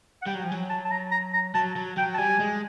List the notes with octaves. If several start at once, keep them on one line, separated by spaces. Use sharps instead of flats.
F#5
G3 G5
F#3
G5
F3
G#5
F#3
A5
A5
A#5
A#5
A#5
F#3 A5
F#3
F#3 G5
A5
G3 G#5
G#3